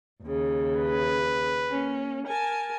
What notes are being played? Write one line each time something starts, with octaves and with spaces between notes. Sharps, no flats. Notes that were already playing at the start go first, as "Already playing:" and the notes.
D#2 C#3
B4
A#3 C#4
A#4 G#5 A5